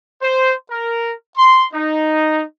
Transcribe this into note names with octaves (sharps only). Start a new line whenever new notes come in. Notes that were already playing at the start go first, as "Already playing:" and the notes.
C5
A#4
C6
D#4